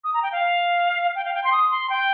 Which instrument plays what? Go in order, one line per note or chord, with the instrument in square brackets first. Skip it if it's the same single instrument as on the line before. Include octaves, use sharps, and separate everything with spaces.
[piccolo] D#6
A#5
G5
F5
G5
F5
G5
C6
D#6
C6
G5